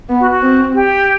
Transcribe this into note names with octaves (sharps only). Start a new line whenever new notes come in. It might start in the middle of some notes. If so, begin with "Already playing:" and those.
B3
F#4
F#4
C4
G4